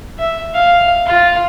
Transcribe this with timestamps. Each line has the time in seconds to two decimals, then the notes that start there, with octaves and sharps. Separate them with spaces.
0.18 E5
0.54 F5
1.06 F4